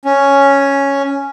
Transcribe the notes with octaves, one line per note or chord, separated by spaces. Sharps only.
C#4